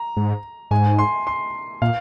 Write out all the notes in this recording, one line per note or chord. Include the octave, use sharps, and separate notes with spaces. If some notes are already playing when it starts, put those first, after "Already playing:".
Already playing: A#5
G#2
G#2 G#5
C6
C6
A#2 F5